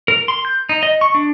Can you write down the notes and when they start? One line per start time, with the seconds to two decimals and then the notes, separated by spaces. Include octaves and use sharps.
0.08 A#4
0.28 C6
0.45 G6
0.69 D#4
0.83 D#5
1.01 C#6
1.15 D4